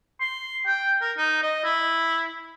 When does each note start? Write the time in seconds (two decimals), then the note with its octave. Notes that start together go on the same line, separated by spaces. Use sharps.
0.21 C6
0.66 G5
1.01 A#4
1.18 D#4
1.43 D#5
1.64 E4